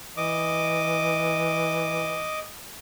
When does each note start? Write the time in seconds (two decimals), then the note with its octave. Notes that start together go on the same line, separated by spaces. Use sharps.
0.17 E3 D#5 D6